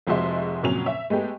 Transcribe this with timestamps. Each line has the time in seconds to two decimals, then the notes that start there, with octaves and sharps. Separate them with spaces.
0.07 F1 F3 G#3 F#4 E5 C6
0.63 F2 A#2 C#3 F#3 C#4 F7
0.86 E5
1.10 G#3 A3 B3 G4